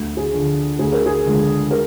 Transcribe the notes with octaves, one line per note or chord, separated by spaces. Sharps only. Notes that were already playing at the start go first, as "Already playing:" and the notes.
Already playing: D2
G#4
D3 F3
D2 G#4
A#4
G#4
D3 F3 G#3
A#4